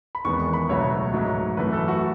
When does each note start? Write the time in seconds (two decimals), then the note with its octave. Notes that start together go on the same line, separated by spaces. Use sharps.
0.15 B5
0.25 E2 D#3 G#3 B3 C#6
0.40 C#6
0.53 B5
0.69 C#2 B2 F#3 A3 C#5
1.14 G#2 F#3 A3
1.57 F#2 E3 A3 B4
1.73 A4
1.88 F#4